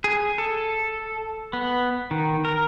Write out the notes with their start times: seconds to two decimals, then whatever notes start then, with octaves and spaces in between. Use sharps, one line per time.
0.04 G#4
0.38 A4
1.53 B3
2.11 D#3
2.45 A#4